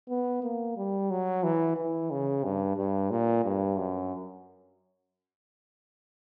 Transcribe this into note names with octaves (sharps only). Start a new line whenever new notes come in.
B3
A#3
G3
F#3
E3
E3
C#3
G2
G2
A#2
G2
F#2